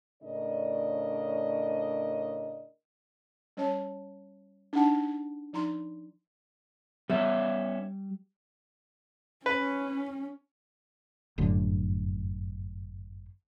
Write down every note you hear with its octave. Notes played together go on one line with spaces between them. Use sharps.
A2 C#3 D4 A#4 D5 D#5
G3 C#4 C#5 A5
D4 D#4 F#5 A5
F3 D#4 A#5 C6
G3 B3 C#4 E5
C#4 B4
G1 F#2 A2 D3